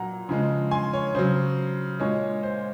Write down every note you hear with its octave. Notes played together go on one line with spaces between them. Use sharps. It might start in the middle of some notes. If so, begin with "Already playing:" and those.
Already playing: A#2 F#3 F#5 A#5
C#3 F3 G#3
G#5 C6
C#5
C#3 F#3 C5
A#2 G#3 C#5
C5